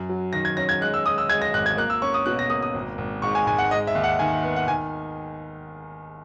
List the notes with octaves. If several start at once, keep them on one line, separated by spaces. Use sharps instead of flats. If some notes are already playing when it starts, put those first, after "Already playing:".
Already playing: F#2
F#3
D#3 A#6
G#6
C#4 A#6
G#6
G#3 F#6
E6
G#3 D#6
E6
G#3 G#6
A#6
G#1 F#6
G#6
A#3 F#6
E6
C#4 C#6
D#6
B2 F#6
A#6
A#3 D#6
D#6
G#1
G#1
G#2 C#6
G#5
G#2 G#5
F#5
G#3 D#5
E5
D#2
F#5
D#3 G#5
B3
F#5
D#3 G#5